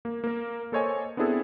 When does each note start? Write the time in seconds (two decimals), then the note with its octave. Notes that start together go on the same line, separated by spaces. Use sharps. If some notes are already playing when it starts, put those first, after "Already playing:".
0.05 A#3
0.24 A#3 A#4
0.72 A#3 A4 C5 C#5 D#5 G#5
1.17 B3 C4 D4 E4 G#4 A4